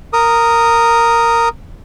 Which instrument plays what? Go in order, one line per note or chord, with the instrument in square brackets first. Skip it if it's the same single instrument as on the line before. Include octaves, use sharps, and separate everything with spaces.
[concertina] A#4 D#6